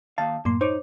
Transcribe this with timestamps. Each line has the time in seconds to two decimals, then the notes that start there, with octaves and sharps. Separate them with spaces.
0.18 D#2 F5 A5
0.45 F#2 A2 A#3 C6
0.61 D#4 C5 C#5 D6